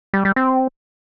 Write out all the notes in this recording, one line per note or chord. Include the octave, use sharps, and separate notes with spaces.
G3
G3
C4